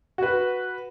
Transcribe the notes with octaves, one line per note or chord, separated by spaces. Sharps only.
F#4 B4